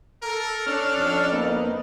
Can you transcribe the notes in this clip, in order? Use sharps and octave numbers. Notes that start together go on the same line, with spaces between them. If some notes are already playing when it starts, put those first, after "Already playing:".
A4 A#4
C#4 D4 A4 F6
F2
A#3 B3 D#4